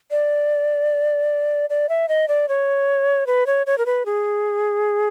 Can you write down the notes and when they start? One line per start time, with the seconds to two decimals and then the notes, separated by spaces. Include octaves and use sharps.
0.11 D5
1.70 D5
1.89 E5
2.09 D#5
2.28 D5
2.49 C#5
3.27 B4
3.46 C#5
3.67 C#5
3.78 A#4
3.86 B4
4.06 G#4